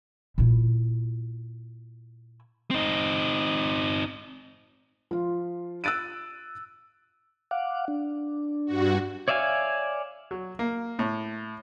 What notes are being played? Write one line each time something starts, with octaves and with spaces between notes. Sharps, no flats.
A#2 E4
C4 D#4
F3 F4
E6 F#6 A6 D7 D#7
F5 F#5 D6
D4
G2 F#4
C#5 D5 E5 F5 G#5
F#3
A#3
A2